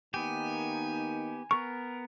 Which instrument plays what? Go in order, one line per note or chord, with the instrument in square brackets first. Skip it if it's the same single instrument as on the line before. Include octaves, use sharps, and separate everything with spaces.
[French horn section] D#3 A#3 D#4 [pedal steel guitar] B3 G4 [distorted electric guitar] G#5
[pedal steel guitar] B3 A#4 [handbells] C#6